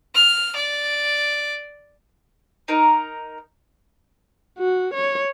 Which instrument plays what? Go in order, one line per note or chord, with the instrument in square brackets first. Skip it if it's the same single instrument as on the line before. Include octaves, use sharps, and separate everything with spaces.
[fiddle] F6
D5
[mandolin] D#4 A#4
[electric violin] F#4
C#5